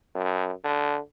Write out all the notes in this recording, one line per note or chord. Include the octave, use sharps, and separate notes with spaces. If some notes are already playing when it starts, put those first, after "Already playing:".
F#2
D3